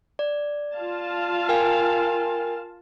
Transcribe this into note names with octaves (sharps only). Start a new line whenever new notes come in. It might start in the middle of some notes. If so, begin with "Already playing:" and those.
D5
F4 F5 A5
A#4 G5 G#5